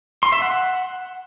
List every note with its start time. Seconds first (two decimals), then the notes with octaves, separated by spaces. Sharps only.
0.23 C6
0.32 E5
0.42 F#5